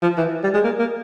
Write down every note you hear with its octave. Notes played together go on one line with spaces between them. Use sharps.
F3
E3
G3
G#3
A#3
A#3